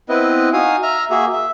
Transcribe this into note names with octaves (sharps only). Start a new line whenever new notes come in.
B3 C4 E4 B4 D#5
D#4 F#4 F5 G#5 D#6
E5 A#5 F6
A#3 F#4 G#4 E5
E5